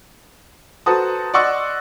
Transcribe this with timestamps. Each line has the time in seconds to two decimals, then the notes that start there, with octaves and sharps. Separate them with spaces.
0.86 F#4 A4 B4 C5 A#5 D#6
1.34 D5 D#5 F#5 C6 C#6 E6